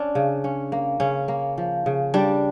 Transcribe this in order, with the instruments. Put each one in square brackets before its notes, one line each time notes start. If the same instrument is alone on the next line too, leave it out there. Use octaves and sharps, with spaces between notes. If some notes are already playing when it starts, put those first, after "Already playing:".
Already playing: [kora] C#4 D4
C#3
C#4
A#3
C#3 C#4
A#3
F3
C#3
G3 D4